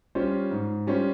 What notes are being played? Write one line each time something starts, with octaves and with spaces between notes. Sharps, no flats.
G3 C#4 F4 C5
G#2
G3 C#4 F4 C5